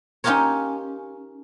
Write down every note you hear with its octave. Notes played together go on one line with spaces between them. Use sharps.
C#4 D#4 F4 G4 A#4 C#5